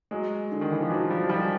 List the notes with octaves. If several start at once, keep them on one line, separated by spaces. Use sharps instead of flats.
F#3 G#3
D3
D#3
E3
F3
E3 F#3
F3 G3
F#3
F3 G3